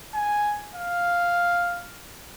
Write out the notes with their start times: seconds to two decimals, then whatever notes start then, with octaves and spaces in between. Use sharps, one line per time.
0.14 G#5
0.75 F5